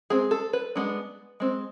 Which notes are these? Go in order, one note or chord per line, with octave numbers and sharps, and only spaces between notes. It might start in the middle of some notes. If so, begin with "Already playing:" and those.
G#3 C4 G#4
A4
B4
G#3 B3 D4
G#3 C4